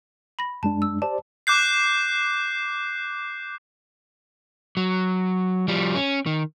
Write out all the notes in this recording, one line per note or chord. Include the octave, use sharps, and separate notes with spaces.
B5 A#6
F#2 G#3 D4 A5
E6
G4 C5 D5 A5
D6 F#6 G6 C7
F#3
F3 G3
C#4
D#3